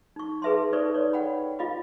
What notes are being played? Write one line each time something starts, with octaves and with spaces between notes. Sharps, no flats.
D#4 C#6
G#4 B4 E5 A5 C6
D#4 A4 B4 C5 D5 C#6
D#4 C#5 D5
F#5 G5 B5
F4 D#5 F5 B5